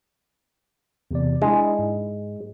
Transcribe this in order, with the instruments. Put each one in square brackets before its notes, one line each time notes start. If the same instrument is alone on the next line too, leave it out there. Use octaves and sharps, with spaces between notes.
[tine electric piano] E2 C3 D5
[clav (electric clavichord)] G#3 [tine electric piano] D4 E4
[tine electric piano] G#2